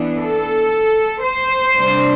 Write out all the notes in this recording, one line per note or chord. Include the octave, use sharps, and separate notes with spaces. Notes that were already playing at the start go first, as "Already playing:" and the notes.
Already playing: E3 B3 D4
A4
C5
C3 G3 D4